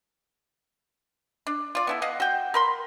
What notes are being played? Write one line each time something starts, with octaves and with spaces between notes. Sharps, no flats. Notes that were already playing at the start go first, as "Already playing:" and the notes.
D4
F4 D5
B3 E4 A4
D#5 F5 F#5
F#4 G5
A#4 B5 C6